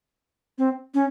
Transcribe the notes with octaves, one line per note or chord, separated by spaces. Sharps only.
C4
C#4